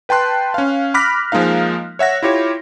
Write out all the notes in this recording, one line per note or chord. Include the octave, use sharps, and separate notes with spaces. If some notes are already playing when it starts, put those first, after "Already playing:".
B4 G5 A5 C6 F#6
C#4 F5
B5 D6 F6 F#6 A#6 B6
F3 G#3 A#3 D#4 F5
C#5 E5 F#5 A#6
E4 F4 G4 C#5